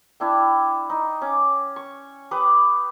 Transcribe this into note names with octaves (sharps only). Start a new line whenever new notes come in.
D4 E4 D5 G5
D#4
C#4 D6
C#6
G4 B4 D6 D#6